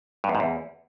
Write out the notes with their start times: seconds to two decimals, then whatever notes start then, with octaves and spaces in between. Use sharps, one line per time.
0.24 G2
0.29 E2
0.35 G#2
0.40 E2